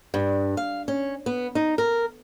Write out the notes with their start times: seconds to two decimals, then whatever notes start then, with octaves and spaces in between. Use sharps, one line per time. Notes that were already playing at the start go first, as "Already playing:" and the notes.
0.14 G2
0.57 F5
0.88 C#4
1.26 B3
1.55 D#4
1.78 A#4